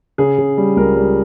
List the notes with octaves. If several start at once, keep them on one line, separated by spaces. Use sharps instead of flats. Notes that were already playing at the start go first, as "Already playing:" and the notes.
C#3 G#4
C#3
G3
C#2 A#4
G3